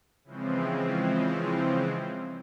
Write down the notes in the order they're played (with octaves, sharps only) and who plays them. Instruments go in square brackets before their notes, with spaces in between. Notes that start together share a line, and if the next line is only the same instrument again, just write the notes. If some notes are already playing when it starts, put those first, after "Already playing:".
[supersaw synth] C#3 E3 F3 G#3 C4